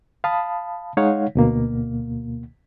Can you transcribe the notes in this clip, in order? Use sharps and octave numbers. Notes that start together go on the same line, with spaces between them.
F5 A5 B5 D#6
G#3 D#4 C#5 F5 F#5
D2 B2 A#3